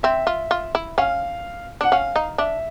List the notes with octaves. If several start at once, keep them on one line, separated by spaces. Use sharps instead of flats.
C4 E5
F4
F4
E4
C#4 F5
D4 F#5
C#4 F5
D#4
D4 E5